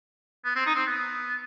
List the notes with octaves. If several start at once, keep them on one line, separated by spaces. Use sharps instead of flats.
B3
C4
D#4
C4
B3